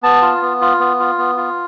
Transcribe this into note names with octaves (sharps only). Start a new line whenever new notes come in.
B3 A5
F4
B3
F4
B3
F4
B3
F4